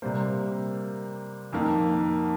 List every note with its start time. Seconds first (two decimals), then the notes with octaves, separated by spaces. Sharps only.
0.02 C3 G3 A#3 C5
1.53 F2 D#3 A#3